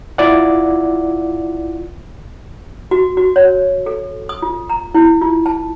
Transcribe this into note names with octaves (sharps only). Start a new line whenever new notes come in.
E4 F4 D5 F#5
F#4
F#4
C#5
A4
D#6
F4
A#5
E4
F4
A5